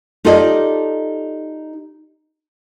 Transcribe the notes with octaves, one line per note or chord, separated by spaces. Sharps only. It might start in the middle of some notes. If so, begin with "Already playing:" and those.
D#4 F4 G4 A4 D5 D#5